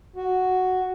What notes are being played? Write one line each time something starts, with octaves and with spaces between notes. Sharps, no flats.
F#4